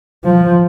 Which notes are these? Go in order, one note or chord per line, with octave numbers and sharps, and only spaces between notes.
F3